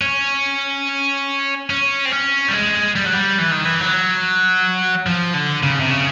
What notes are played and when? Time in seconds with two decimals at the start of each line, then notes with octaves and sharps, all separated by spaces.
0.01 C#4
1.70 C#4
2.05 C4
2.12 C#4
2.48 G3
2.53 G#3
2.95 G3
3.05 F#3
3.13 G3
3.39 E3
3.51 D#3
3.65 E3
3.80 F#3
5.07 F3
5.34 D3
5.63 C#3
5.80 C3
5.91 C#3